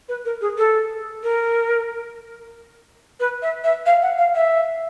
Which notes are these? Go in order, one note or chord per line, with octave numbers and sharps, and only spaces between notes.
B4
A#4
G#4
A4
A#4
B4
E5
E5
F5
F#5
F5
E5